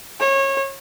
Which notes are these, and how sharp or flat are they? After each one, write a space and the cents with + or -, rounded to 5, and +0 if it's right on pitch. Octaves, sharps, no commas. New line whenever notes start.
C#5 -25